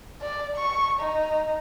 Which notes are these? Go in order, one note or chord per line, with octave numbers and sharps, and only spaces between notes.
D5
C#6
D#4